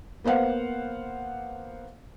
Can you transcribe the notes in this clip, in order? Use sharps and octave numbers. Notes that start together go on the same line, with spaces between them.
A#3 B3 C5 F5 F#5